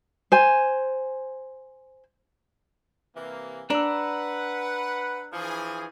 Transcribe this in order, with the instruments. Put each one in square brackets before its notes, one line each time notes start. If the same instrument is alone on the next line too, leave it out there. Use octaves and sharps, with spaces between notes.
[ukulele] C5 G#5
[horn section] C3 E3 A#3
[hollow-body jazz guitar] D4 [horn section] B4 F#5 [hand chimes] A#5 E6
[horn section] E3 F3 G#4